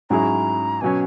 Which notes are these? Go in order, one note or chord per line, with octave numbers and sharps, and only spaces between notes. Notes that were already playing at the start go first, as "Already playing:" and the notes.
G#2 F#3 C#4 E4 G#4 A#5
B2 F#3 C#4 G#5